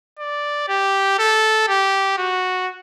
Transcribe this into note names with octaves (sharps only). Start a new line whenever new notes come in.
D5
G4
A4
G4
F#4